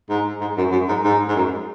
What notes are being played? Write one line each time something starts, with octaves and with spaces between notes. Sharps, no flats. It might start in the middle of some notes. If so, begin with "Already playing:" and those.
G#2
G#2
F#2
F#2
G#2
G#2
G#2
F#2